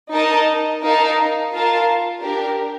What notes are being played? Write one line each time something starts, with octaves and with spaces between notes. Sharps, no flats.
D#4 A#4 D#5 A5
D#4 A#4 F5 A5
F4 A#4 F5 A5
D4 G4 A#4